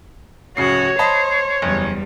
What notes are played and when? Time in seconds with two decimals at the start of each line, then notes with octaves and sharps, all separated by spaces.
0.57 D1 C#3 F#4 C#5 C7
0.99 C5 D#5 A5 B5
1.62 F#1 E2 G3